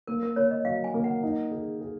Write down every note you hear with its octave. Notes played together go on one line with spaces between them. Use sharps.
A#3 A#4
A#4
A#3 C#5
D#5
F#3 F5
G#5
A#3
F#5
D#4
G#4
G#4